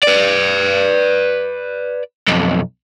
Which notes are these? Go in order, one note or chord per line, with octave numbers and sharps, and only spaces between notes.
B4 D5
B1 F2